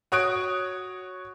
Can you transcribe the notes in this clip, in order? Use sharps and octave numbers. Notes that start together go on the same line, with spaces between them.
F#4 C#5 D#6 F#6 D7